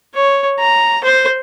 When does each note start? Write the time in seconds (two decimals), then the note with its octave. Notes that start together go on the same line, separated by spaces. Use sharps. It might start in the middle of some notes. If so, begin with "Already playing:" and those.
0.15 C#5
0.59 A#5
1.04 C5